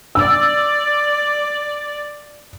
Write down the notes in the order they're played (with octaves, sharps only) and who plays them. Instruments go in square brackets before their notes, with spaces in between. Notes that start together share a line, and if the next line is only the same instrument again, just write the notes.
[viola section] D5 [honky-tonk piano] E6